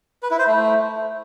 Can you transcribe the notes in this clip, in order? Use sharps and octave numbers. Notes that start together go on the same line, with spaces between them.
B4
E4
C5
A3